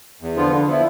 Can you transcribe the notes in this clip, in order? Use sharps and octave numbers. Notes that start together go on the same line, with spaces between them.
E2
D3 F3 B3 F4
D3
F3 B3 E4